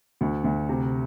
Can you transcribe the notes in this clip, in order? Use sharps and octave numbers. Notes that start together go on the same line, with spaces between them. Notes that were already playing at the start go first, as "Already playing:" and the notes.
D2
D2
C3